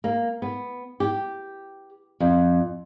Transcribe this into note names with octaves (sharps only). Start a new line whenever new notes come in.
A#3
B3
G4
F2